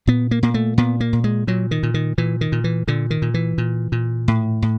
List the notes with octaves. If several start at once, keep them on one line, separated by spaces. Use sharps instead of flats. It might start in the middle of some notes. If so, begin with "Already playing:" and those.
A#2 B3
A#3
A#2 A#3
A3
A#2 B3
A#3
A#2
G#3
A#2 F#3
D#3
A#2
D#3
A#2 E3
D#3
A#2
E3
A#2 D3
D#3
A#2
E3
A#2
A#2
A2
A2